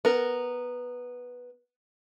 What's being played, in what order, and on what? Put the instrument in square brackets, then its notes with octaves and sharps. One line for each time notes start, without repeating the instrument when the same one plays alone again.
[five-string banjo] B3 A#4